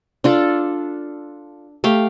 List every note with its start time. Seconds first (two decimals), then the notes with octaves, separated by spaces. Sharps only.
0.24 D4 F4 A4
1.84 A3 G4 F5 G5